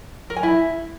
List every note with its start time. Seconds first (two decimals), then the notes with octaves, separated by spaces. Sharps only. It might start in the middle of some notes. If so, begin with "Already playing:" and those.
0.30 A#4
0.36 G#5
0.43 E4